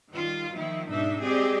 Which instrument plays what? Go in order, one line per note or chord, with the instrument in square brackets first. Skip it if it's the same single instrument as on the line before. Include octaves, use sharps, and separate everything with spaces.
[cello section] D#3 G3 F4
D#3 F3 A#3 E4
G#2 B2 D4 D#4 E5
G#3 C4 G4 G#4 D5 D#5